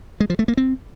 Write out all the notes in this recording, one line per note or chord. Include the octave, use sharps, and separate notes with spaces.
G#3
F3
A3
A#3
C4